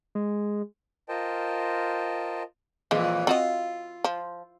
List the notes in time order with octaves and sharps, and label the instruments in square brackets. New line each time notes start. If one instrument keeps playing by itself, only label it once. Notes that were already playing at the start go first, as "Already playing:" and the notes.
[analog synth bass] G#3
[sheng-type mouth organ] F4 A#4 C5 D#5 G5 A5
[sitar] F2 A#2 E3 [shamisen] G#3 F4
[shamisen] C4 F#4 D#5 [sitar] F4
[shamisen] F3